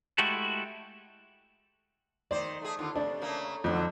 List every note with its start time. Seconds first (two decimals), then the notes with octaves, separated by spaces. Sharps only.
0.18 G#3 A3 E4 F#4 G4 A4
2.31 D#3 C5 D5
2.61 A3 G#4
2.79 D#2 D3 F4
2.96 C3 D4
3.22 C#3 A3 A#3
3.64 F2 G#2 D3 F#3